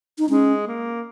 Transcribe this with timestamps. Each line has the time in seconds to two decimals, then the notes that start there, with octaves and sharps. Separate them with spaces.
0.18 D#4
0.28 G#3 C#4
0.67 A#3